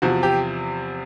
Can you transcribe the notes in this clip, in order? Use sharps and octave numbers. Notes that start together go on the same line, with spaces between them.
E2 C3 F3 F#4
G4